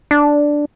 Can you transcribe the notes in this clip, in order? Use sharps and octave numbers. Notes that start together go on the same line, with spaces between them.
D4